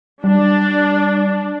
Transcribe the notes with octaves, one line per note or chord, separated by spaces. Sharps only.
G3 D4